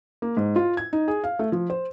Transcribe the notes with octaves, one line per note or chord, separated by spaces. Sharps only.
A#3
G#2
F4
G#6
D#4
G#4
F5
A3
F3
C5